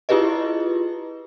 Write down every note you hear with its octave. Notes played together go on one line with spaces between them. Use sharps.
E4 F4 G4 G#4 B4 D#5